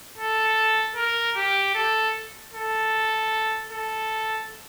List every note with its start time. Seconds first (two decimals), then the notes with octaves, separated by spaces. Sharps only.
0.18 A4
0.95 A#4
1.36 G4
1.75 A4
2.54 A4
3.72 A4